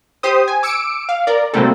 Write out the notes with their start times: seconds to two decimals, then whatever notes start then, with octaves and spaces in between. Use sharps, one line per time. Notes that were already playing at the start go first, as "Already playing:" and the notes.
0.23 G4 C5 D#6
0.48 G#5
0.63 D6 E6 C#7 D7
1.09 F5
1.27 A#4 D5
1.54 C3 F#3 G3 A3 A#3 A4